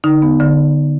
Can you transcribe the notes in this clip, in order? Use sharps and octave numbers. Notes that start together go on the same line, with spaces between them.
D3 D#4
B3
D3